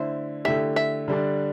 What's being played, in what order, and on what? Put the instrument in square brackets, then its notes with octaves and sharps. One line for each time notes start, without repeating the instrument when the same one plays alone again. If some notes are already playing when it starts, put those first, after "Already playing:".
Already playing: [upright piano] D3 A3 E4 [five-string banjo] C5
[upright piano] D3 A3 E4 G4 [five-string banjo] E5
[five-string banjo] E5
[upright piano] D3 G3 D4